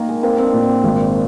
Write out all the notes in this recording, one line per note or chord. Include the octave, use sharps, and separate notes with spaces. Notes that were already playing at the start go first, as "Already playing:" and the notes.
Already playing: D#3 A#3
G#3
A#3 C4
C4
D4
A#2
C4
G#1